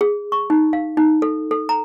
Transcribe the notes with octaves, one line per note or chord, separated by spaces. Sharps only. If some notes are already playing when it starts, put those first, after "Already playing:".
G#4
C#6
D#4
F5
D#4
A4
A4
A#5